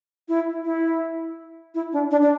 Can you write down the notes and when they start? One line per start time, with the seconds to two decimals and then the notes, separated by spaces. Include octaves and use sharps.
0.28 E4
0.65 E4
1.75 E4
1.93 D4
2.11 D4
2.22 D4